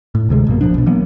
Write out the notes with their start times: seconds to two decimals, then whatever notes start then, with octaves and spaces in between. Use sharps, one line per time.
0.15 A2
0.29 D1 D2 C3 G#3
0.47 A#1 G2 B2 A#3
0.61 D#1 F3 D4
0.74 B1 B2
0.86 E3 F#3 A#3 B3